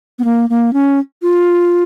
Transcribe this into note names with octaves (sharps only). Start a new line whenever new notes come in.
B3
A#3
A#3
C#4
F4